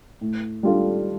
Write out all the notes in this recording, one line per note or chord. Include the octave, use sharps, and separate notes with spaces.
A2
G3 D4 F4 A4